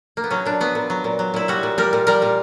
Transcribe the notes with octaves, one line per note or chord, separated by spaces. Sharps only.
A#3
B3
F#3 C#4
A#2 D4
F#3 B3
A#2
F#3
A#2
F#3
A#2 E4
G3 F#4
A#2
G3 A#4
A#2
G3 A#4
A#2